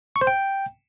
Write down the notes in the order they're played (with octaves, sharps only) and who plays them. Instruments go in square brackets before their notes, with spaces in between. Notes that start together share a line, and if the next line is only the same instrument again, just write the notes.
[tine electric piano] C#6
C5
G5